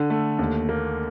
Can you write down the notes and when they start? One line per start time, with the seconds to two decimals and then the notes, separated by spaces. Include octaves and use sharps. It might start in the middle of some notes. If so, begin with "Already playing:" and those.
Already playing: D3
0.10 A3
0.39 D#2
0.69 A#3